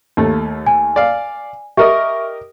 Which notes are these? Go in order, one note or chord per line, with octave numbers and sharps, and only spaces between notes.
D#2 A3
G#5
D5 F5
G4 A#4 D#5 E5 C#6